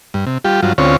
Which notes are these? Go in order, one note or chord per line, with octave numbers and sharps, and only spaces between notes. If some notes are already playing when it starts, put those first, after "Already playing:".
G2
C3
G3 F4 G4
G2 F#3 F4
D2 C4 C#4 F4 C#5